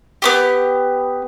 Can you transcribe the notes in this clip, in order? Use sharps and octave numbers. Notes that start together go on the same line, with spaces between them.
B3 C#4 G4